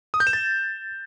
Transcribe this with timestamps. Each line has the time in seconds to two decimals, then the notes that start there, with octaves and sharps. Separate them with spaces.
0.14 D#6
0.20 G6
0.27 E7
0.33 A6